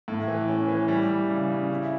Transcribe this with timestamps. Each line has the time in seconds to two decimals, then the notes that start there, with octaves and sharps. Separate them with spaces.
0.08 A2
0.28 E3
0.48 C#4
0.68 E3
0.88 G3
1.09 G3
1.30 C#3
1.50 C#3
1.70 E4